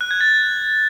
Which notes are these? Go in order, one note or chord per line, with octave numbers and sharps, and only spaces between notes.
F#6
G#6
A6